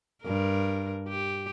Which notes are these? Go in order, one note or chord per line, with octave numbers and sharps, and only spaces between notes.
G2 A#4
G4